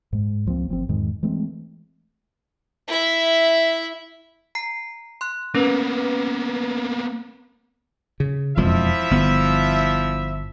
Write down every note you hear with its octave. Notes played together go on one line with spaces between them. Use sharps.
G#2 G#3
C#2 F3 A#3 C4
G1 F3 C4
E2 G#2 D#3 G#3
E3 G#3 A3 C4
E4 E5
A#5 C7
C6 F#6
A#3 B3 C#4 B4
C#3
E1 F2 F3 G#3 E4 E5
G1 B3